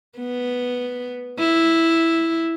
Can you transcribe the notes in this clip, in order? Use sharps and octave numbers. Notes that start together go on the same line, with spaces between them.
B3
E4